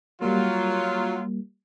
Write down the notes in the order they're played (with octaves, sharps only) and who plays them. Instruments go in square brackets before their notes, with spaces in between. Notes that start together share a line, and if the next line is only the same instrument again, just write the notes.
[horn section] F#3 F4 [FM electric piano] G3 A#3